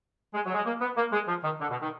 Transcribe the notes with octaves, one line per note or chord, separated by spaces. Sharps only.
G#3
F#3
G#3
A#3
B3
A#3
G#3
F3
D#3
D3
B2
D#3